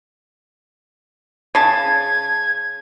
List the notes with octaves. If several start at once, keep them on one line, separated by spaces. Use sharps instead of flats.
C#3 A5 G#6